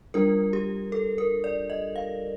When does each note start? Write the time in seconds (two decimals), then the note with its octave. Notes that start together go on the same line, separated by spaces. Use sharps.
0.14 G3 D4 F4 A#4
0.53 G4
0.92 A4
1.18 A#4
1.44 D5
1.70 D#5
1.96 F5